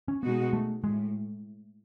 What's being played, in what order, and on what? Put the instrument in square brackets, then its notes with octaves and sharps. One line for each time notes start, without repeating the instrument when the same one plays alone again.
[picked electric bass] C#4
[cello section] B2 G#3 D#4 F#4 [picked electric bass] B3
[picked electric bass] A3
[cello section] A2 [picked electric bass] G#3